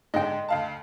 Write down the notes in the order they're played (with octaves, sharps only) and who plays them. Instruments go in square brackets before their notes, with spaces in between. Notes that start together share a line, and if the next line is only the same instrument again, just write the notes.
[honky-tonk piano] G#2 D3 [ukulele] D#5 G5
[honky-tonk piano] D2 F5 A5